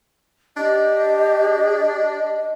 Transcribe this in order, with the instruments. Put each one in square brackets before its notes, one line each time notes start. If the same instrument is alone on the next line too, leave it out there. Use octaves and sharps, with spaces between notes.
[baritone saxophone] D4 [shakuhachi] G4 [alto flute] D#5